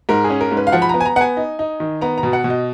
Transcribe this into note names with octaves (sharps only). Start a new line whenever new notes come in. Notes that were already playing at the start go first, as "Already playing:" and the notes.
G#2 A#4
G#4
C#4
A#4
G#2
B4
F5
F3 F#5
B5
B3 A#5
G#5
A#5
B3 F#5 G#5
D#4
D#4
D#3
B3 A#5
A#5
B2
F#5
B2
D#5